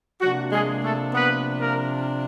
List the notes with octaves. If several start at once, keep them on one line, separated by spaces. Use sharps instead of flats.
C3 F3 F#3 A#3 D4 F#4
G#3 G#4
A3 A4
B3 B4
A#3 A#4